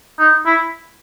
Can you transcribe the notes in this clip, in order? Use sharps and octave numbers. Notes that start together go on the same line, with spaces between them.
D#4
E4